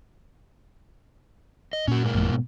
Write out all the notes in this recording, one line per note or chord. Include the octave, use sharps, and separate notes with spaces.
D#5
A#2 C#4 F#4
G#2 A#3
G#1 F2 A2
B2